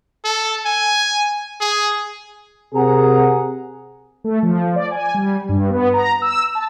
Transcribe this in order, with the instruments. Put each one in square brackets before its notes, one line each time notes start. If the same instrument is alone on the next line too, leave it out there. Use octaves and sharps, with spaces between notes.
[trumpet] A4
G#5
G#4
[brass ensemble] C3 G#4 A#4 F#5 A#5
[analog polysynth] A3
F3
D5
G#5
G3
G2
B3
A#5
E6
A5